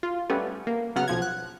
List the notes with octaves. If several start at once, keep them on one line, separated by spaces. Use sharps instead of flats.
F4
G3 A3 B3 C#4
A#3
C#3 F#3 B3 F#5 F6
B1 F3 G#6
F#6